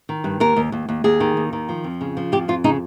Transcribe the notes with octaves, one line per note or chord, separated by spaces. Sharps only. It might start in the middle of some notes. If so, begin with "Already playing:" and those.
D#3
G2
D#2 A#4
D#2
D#2
D#2
D#2 G#4
D#3
D#2
D#3
F3
F2
C#3
F3
F2 G4
F2 F4
C#3 D#4